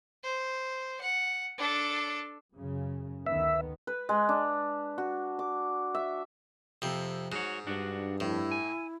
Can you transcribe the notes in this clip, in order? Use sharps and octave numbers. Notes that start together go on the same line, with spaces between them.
C5
F#5
D4 A4
F#2 C#3
D2 D#3 B3 E5
B4
G#3
D4
F#4
D6
E5
F2 C3
G#2 F#4 C#5
G2 D4 F#4
F2 A2 E4
G#5